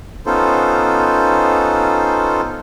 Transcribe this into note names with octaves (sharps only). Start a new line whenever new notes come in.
B3 C#4 D#4 F4 A4 C5